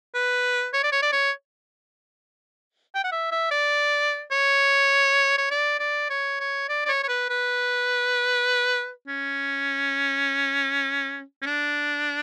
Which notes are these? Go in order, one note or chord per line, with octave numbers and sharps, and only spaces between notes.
B4
C#5
D5
C#5
D5
C#5
G5
F#5
E5
E5
D5
C#5
C#5
D5
D5
C#5
C#5
D5
D5
C#5
C#5
B4
B4
C#4
C#4
D4